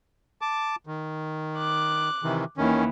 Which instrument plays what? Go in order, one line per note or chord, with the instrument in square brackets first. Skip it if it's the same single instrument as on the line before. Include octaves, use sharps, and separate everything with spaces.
[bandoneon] A5 D6
D#3
[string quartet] D6 F#6
[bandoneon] C3 D#3 E3
[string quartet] D#2 E3 [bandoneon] D#3 C#4